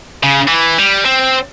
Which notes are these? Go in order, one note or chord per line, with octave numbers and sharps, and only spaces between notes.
C#3
E3
G3
C4